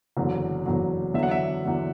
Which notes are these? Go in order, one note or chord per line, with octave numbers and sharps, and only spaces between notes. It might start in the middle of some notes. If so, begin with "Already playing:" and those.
F#1 E2 D3 F#3
F#1 E2 D3 F#3
E2 D3 F#3 E5
F#5
E5
E2 D3 F#3